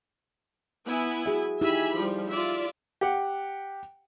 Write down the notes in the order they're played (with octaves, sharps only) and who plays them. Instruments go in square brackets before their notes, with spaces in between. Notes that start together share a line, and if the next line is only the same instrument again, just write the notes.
[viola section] B3 E4 G#5
[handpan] F#4 G#4 E5
[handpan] D#4 E4 G4 [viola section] E5 G#5 B5
[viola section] F3 G3
F4 D5 E5
[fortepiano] G4 F#5